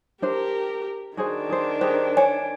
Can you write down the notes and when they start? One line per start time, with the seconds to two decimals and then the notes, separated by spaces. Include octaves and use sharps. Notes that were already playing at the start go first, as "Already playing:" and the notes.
0.22 D4 G4 A#4 C5
1.17 D#3 D4 F#4 G#4 C5
1.50 G#4 C5
1.81 G4 G#4 A#4 C5
2.17 C#5 G#5